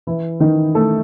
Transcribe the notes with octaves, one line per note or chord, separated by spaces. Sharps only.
E3 E4
D#3 D#4
A3 A4